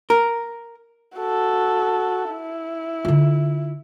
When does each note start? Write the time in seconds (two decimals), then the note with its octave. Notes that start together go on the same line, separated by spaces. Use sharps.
0.10 A#4
1.18 F#4 A4
2.31 E4
3.05 D3 F4